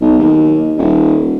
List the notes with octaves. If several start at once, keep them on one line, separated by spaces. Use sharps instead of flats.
B1
D#2
D#1